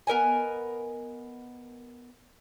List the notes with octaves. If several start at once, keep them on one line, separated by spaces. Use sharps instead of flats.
B3 A#4 D#5 G#5